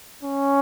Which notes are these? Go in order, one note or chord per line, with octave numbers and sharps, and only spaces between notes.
C#4